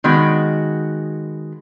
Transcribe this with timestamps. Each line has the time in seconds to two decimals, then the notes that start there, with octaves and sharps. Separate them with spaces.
0.04 D#3 G#3 B3 F#4